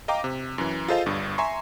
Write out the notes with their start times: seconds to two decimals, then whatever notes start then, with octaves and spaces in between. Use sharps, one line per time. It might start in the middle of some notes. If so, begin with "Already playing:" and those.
0.08 D#5 F5 G5 A#5 D6
0.24 C3
0.58 F#2 E3
0.88 F4 G#4 A4 C5 D#5 F5
1.06 G1 G2
1.38 E5 G#5 A#5 C6 C#6